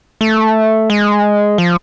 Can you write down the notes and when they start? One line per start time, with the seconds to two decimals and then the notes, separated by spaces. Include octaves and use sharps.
0.21 A3
0.90 G#3
1.58 F3